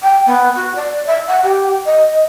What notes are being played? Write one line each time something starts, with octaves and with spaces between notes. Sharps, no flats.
G5
B3
F#4
D5
E5
F#5
G4
D#5